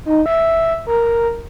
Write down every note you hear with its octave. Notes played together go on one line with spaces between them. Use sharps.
D#4
E5
A#4